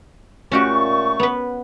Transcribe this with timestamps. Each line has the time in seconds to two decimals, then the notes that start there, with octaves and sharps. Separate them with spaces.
0.52 A#2 A3 C#4 F#4 G4 C#6
1.20 B3 B4